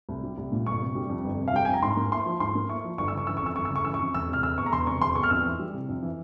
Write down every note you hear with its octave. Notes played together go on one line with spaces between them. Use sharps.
C2
G3
C2
A#2
G1 C#6
C3
G3
F2
G1
C3
F5
G3 G5
F2 G#5
A#5
G#2 C6
A#3
E4 C6
F3
G#2 C6
A#3
E4 C#6
F3
G1 C#6
E6
C#3 C#6
E3 E6
C#6
F2 E6
G1 C#6
E6
C#3
C#6
E3 E6
C#6
F2
E1 E6
C3 F6
E1 E6
E2 C#6
A#5
E1 C6
C3 C#6
E1 C6
E2 C#6
F6
F2 E6
E3
G3
C3
F2
E3